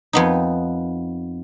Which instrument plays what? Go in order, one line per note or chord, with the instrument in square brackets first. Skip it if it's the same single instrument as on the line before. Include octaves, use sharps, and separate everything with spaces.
[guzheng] F2 B3 D#4